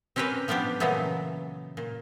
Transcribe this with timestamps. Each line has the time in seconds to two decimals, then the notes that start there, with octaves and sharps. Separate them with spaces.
0.16 C4 C#4 G4 A#4 B4 C#5
0.48 F3 G3 B3 D4 G4
0.80 A#2 C#3 E3 F#3 A3 B3
1.77 A#2